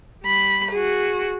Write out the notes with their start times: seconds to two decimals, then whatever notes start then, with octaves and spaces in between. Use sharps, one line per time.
0.24 G3 B5
0.71 F#4 G#4